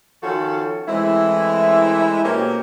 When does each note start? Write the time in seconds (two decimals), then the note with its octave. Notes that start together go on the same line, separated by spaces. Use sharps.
0.23 D#3 F3 C#4 F#4 A4
0.88 E3 G#3 A3 C4 E4
2.24 B2 A#3 C4 C#4 G4 A4